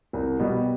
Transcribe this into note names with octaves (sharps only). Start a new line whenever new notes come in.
C2
B2 G3